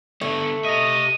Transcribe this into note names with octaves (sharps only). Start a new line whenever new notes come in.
D3 A3 B3
G4 D#5 E5 D#7